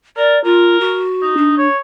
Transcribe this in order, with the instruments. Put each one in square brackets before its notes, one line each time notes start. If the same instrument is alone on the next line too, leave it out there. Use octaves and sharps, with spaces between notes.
[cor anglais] A#4 [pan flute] D5
[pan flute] F4 [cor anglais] A#4
[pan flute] F#4
[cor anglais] D#4
[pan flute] D4
[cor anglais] C#5